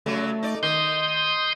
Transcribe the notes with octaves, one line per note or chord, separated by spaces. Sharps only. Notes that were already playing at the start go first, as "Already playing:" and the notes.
C#3 F#3 G3 A3
D#4 D5
D#3 C6 D#6 G6